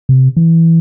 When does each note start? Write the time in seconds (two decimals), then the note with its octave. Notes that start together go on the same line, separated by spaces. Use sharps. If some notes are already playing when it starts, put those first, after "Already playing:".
0.09 C3
0.37 E3